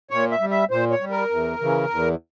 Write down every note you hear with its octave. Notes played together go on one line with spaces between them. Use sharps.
A#2 C#5
E5
G3
E5
A#2 C5
C#5
G3
A#4
E2
C#3 E3
E2